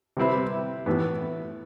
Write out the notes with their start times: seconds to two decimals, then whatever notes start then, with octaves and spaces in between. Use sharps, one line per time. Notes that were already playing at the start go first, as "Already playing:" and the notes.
0.17 C3 G3 C4 E4 B4
0.86 A2 E3 B3